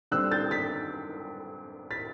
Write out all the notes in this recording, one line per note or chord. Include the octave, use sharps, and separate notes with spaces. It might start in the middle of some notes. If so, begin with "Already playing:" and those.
D3 G3 C4 E6 F#6
G6 A6
A6 B6
A6 B6